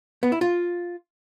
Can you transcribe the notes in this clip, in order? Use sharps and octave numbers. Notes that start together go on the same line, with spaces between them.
B3
E4
F4